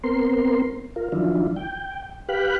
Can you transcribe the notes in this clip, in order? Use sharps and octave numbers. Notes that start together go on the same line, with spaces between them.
B3 C4 A#4 C6
F4 A#4
D#3 F3 F#3 D4 E4 F4
G5
G4 B4 F5 G5 B5 F#6